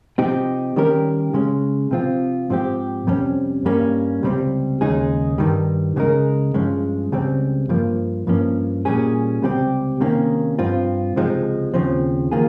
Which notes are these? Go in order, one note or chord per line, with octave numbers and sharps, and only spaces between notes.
C3 F3 C4 D#4 G4
D#3 G3 C#4 G4 A#4
C#3 G#3 C#4
C3 F3 C4 F4
G#2 F3 C4 G4
F2 C3 G3 C#4
G2 G3 A#3 C#4
C#2 C3 G3 C4
D#2 C#3 G#3 D#4 G#4
G2 D#3 G3
C#2 C#3 G#3 D#4 A#4
G2 F3 G#3 C#4
C#2 C#3 G3 C4
G2 F3 A#3
G2 F3 A#3 C#4
A#2 G3 C#4 G#4
C#2 C3 G3 C4 G4
C3 D#3 A#3 C#4
G2 F3 C4 F4
C#2 C3 F3 G#3 D#4
D#2 C#3 F3 C4
D#3 A#3 F4 G#4